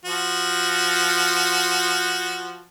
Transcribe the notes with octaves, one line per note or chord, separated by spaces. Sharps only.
F3 F#4